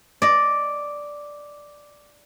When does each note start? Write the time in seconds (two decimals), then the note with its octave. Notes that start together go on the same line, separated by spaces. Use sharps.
0.22 D5 D#5